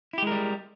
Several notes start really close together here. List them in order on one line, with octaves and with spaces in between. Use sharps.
E4 G4 G#3 A#4 G3